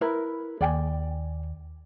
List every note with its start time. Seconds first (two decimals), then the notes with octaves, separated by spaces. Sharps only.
0.01 E4 A#4 B4
0.61 D#2 D5 G5 G#5